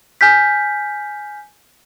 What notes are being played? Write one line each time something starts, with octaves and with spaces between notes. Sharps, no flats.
G#5 F6 G6 B6